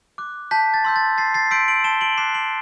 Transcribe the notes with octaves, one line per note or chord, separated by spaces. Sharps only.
D6 F#6
A5 G6 B6
A6
C6 E6 G6
A6
A5 A6 C7
A6 C7
C6 E6 G6 B6 D7
D7 F#7
A5 E7 G7
D7 F#7
D6 F#6 C7 E7
D7 F#7